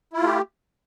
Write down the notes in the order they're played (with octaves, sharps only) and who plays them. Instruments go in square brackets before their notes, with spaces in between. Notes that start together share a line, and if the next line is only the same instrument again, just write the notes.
[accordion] E4
F4
A3
G4